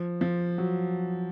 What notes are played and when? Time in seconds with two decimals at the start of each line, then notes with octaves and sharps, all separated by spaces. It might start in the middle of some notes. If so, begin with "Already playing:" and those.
Already playing: F3
0.21 F3
0.58 F#3